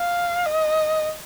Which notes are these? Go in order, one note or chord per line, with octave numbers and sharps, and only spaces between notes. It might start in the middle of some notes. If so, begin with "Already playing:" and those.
Already playing: F5
D#5